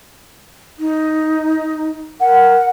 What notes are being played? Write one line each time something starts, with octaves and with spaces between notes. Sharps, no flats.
D#4
A#4 F#5